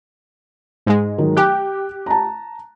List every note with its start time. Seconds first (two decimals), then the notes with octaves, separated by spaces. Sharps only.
0.86 G#2 G#3
1.18 D#3 F#3 D#4
1.37 G4 G5 D6 F#6
2.06 A5 A#5